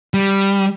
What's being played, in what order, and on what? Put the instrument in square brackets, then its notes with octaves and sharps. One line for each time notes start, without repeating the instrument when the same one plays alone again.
[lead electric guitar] G3